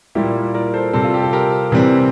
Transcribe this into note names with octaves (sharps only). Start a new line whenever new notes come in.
A#2 G3 A#3 E4 G4
A#4 D5
A4 C5
C3 G3 C4 A4 C5
F4
G4
A4
G4 A#4
C3 E3 G3 C4